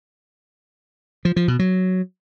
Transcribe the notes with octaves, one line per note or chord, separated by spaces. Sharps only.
F3
F3
B2
F#3